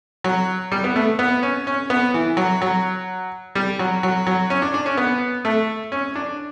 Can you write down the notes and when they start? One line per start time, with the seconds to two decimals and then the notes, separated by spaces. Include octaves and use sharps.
0.24 F#3
0.72 G3
0.84 B3
0.96 A3
1.19 B3
1.43 C#4
1.67 C#4
1.90 B3
2.14 E3
2.37 F#3
2.62 F#3
3.55 G3
3.79 F#3
4.03 F#3
4.27 F#3
4.50 C#4
4.62 D4
4.74 D4
4.86 C#4
4.97 B3
5.45 A3
5.92 C#4
6.16 D4